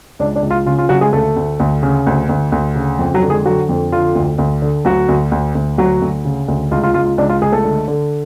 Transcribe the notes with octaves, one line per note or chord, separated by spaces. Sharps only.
C#2 D4
D4
C#2
F4
C#3 F4
F4
C#3 F#3 F#4
G#3 G#4
D2 A3 A4
D2
D2
C#3
D2
D2
D2
C#3
F2
F#3 F#4
D3
G#3 G#4
D3 F#3 F#4
F2
D3 F4
D2
D2
D3
D2 F#3 F#4
D2
D2
D2
D2 F#3 F#4
D2
C#3
D2
C#2 F4
F4
C#2 F4
F4
C#2 D4
F4
C#2 G#4
A3 A4
D3
D3